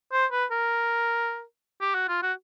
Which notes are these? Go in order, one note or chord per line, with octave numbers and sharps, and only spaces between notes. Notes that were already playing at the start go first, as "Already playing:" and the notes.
C5
B4
A#4
G4
F#4
F4
F#4